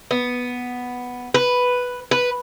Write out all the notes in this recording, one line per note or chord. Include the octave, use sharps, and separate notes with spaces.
B3
B4
B4